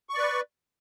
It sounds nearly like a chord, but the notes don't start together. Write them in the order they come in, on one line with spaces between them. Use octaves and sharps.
C#6 D5 B4